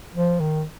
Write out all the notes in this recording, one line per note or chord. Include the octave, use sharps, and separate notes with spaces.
F3
D#3